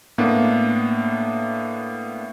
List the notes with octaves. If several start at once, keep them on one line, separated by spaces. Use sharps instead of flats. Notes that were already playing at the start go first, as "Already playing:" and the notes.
A2 A#3 B3 D4